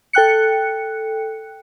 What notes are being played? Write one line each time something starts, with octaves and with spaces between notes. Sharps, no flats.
A4 G5 F#6 C#7